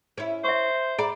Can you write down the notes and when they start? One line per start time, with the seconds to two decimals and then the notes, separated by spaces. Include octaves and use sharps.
0.18 C#4 E4
0.44 C5 E5 C#6
0.99 G#4 D5 A#5 B5